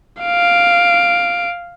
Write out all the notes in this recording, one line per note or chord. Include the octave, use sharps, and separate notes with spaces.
F5 D7